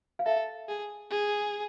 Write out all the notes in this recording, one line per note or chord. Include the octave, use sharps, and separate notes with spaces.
F5
A4 E5
G#4
G#4